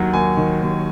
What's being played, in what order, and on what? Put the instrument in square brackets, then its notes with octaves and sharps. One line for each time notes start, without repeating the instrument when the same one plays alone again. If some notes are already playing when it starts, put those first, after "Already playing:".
Already playing: [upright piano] D#2 D#3 F#3
D#2 G#5
D#3
D#2